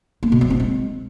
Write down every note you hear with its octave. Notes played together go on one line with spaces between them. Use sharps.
A#3
B2
F#3
C4
G#3